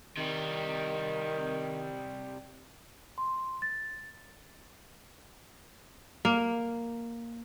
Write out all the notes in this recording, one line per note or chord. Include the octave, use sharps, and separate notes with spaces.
C3 D#3 G3
C6
A6
A#3